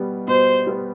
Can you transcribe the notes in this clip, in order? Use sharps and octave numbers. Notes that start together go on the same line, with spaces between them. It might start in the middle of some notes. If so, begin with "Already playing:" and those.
Already playing: B2 G3 B3
B2 C5
G3 B3